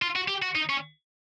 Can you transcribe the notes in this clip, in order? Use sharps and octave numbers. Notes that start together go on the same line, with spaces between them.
F4
F#4
G4
F#4
D#4
C#4